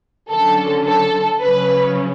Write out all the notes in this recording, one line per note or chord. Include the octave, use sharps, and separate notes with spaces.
D3 F#3 C#4 A4
A4
C#3 F#3 C#4 B4